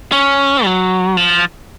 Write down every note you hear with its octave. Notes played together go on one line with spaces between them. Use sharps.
C#4
F#3
F3